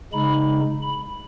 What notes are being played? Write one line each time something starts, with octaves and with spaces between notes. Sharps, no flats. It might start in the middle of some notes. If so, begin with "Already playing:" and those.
C#3 G#3 D#4 B5
B5